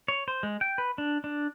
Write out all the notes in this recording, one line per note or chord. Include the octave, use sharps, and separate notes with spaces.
C#5
C5
G#3
G5
B4
D4
D4